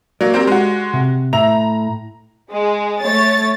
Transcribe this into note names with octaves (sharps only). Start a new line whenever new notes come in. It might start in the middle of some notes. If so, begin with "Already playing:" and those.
F#3 A#3 D5
C4 G4 A#4
G#3 F#4
C3
A2 E5 A#5 F7
G#3
A3 C#5 A6